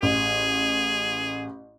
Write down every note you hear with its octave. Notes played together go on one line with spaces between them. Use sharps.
A1 G#4